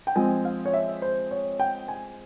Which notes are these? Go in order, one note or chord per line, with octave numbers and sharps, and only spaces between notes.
G5
F3 G#3 C4 G#5
F5
C#5
E5
C5
C#5
G5
G#5